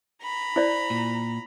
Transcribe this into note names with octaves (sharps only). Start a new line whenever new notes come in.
A#5 B5
E4 C5 D5
A#2